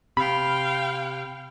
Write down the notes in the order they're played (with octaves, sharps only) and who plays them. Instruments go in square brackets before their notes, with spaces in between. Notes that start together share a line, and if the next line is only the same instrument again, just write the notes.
[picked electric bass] C3 [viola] F5 G5 [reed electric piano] B5